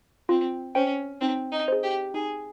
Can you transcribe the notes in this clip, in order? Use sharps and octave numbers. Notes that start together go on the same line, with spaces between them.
C4 F4
C#4 C5 G5
C4 D#4
D#4
G#4 C5
G4
D#4 G#4